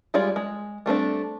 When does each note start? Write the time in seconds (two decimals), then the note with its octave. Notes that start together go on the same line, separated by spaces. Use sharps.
0.14 G3 G#3 F4 G#4 D5
0.36 G#3
0.86 G3 A3 C4 D4